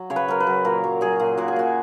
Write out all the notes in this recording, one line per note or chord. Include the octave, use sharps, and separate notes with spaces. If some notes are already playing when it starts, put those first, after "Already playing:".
Already playing: F#3
C#3 C#5
B4
F#3 A#4
B4
F#3
A#2 A#4
F#3
F#3 G#4
A#2
A#2 F#4
G#4
A#2 F#4